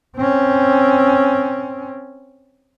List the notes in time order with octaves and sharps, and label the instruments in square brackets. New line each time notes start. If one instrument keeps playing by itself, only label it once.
[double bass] C4 C#4